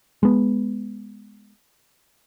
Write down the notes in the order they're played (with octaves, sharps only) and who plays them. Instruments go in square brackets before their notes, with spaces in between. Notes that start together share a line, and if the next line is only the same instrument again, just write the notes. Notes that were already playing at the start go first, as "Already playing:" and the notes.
[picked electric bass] G#3 B3